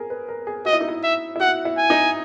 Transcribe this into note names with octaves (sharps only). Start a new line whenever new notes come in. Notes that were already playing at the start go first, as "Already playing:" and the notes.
Already playing: G#4 A#4
B4
A#4
G#4
F#4 D#5
E4
D#4
E4
E5
E4
F#4 F#5
E4
G#5
D#4